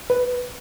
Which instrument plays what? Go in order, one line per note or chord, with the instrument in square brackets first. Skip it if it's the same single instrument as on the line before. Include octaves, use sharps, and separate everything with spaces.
[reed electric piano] B4